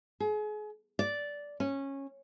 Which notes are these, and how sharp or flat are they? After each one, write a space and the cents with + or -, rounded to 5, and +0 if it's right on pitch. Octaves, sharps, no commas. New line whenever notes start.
G#4 +35
D5 -10
C#4 -15